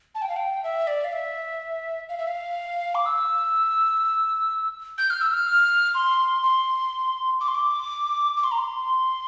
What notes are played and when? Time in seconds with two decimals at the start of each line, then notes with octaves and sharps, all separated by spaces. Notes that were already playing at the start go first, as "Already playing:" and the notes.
0.15 A5
0.22 G5
0.29 F5
0.36 G5
0.63 E5
0.87 D5
1.04 F5
1.12 E5
2.09 F5
2.18 E5
2.27 F5
2.95 D6
3.06 E6
4.98 G6
5.10 F6
5.21 E6
5.34 F6
5.95 C6
6.43 C6
7.41 D6
7.48 C6
7.55 D6
8.37 D6
8.44 C6
8.51 A#5
8.58 C6